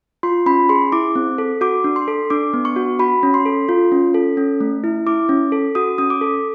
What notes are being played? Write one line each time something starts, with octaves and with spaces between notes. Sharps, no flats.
F4 C6
C#4 B5
G#4 C6
E4 D6
C4
A4
F#4 D6
D4
C6
A4
D4 D6
B3
C#6
F#4
F#4 B5
C#4
C6
A4
F4
C#4
A4
C#4
A3
E4
E4 D6
C#4
A4
F#4 D#6
C#4 D#6
D6
A4